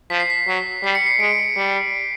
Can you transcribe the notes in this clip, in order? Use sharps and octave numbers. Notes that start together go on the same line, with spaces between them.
F3 B6
C7
B6
F#3
G3 C7
C#7
C7
G#3 D7
G3